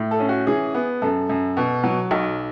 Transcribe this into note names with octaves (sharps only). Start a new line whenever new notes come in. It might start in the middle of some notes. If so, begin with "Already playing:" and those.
Already playing: A2
A4
C#4
F#4
E3 G#4
B3
F#2 A4
F#2
B2
F#3
B1